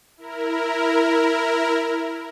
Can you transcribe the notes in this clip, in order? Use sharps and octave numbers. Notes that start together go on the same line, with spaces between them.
E4 A#4